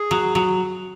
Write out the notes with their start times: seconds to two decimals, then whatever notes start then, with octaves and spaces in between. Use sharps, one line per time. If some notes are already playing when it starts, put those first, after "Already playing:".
Already playing: G#4
0.11 F#3
0.35 F#3